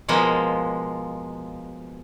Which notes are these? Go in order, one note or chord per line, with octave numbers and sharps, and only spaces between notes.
B2 F3 G#3 A#3 B3 D#5